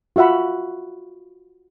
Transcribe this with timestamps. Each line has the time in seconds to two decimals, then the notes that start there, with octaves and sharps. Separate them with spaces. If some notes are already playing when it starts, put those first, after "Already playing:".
0.16 F4 F#4 E5 F#5 B5